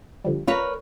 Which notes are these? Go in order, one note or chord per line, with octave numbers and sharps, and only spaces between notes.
D3 F3 G3
F4 A#4 B4 C#5 A#5